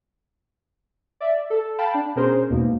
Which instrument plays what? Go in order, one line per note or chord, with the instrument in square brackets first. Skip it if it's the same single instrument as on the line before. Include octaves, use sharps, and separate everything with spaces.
[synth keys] D5 E5
A4
F5 G5 A5 B5
D4
B2 C#4 G#4 A#4 C5
E2 G#2 B2 A#3